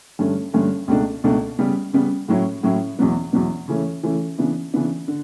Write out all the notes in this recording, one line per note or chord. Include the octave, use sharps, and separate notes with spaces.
G2 D3 A3 C#4
G2 D3 A3 C#4
C#2 B2 A3 D4
C#2 B2 A3 D4
C#3 G3 B3
C#3 G3 B3
A2 F#3 C#4 E4
A2 F#3 C#4 E4
E2 B2 F#3 B3
E2 B2 F#3 B3
C#3 E3 A3 C#4
C#3 E3 A3 C#4
C#3 E3 B3 D4
C#3 E3 B3 D4
D3